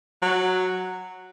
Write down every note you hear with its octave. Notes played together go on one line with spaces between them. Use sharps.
F#3